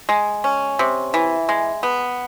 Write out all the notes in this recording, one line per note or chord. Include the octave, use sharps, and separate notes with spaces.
G#3
C#4
C3
E3
G#3
B3